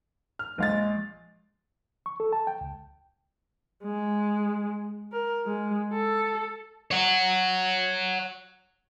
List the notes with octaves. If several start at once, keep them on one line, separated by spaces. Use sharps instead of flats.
F6
A#1 G#3 F5 A6
C#6
A4
A5
G5
C#2
G#3
A#4
G#3
A4
C#5 F#5